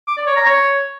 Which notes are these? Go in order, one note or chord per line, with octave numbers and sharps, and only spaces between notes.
D6
D5
C#5
A#5
C#5